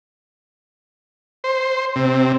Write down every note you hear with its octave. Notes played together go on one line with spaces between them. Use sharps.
C5
C3